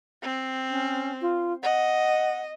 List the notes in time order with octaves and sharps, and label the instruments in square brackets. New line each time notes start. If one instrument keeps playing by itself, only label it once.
[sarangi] C4
[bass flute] C#4
F4
[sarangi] D#5 [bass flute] F#5